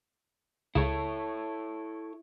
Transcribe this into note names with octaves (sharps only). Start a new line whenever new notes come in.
C#2 E4 A4 C#5